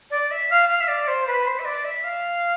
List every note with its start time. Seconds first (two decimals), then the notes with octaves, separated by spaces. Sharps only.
0.10 D5
0.31 E5
0.50 F5
0.69 F5
0.80 E5
0.88 D5
1.07 C5
1.27 B4
1.47 C5
1.59 E5
1.65 D5
1.84 E5
2.04 F5